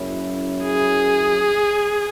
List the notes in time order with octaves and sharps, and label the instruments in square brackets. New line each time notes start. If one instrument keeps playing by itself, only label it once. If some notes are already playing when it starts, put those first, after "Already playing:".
Already playing: [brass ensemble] F#1 F#2 F#3 C#4 E4
[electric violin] G#4